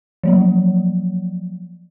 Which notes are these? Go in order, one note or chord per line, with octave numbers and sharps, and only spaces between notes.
F3 F#3 A#3